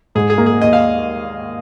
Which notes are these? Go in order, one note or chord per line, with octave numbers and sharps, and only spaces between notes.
G#2 G#4
G#4
A#3
G#4
D#2 D#5
F5